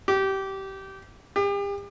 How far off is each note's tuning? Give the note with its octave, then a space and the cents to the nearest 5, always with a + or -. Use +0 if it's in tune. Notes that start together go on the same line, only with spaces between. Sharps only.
G4 -20
G4 +40